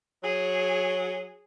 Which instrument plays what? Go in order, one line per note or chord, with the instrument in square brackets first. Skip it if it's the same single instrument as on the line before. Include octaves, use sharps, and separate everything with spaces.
[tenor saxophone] F#3 [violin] G#4